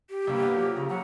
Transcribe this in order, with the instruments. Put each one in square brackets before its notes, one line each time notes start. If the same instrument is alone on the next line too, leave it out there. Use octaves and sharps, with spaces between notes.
[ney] G4
[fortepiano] C2 G2 [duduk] A#3
[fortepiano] B3
F3 F#3 A4
[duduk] C#3 [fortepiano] A#5
[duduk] F#3 [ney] F#5